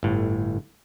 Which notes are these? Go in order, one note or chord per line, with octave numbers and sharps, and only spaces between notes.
G1 A2